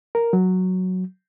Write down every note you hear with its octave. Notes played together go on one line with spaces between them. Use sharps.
A#4
F#3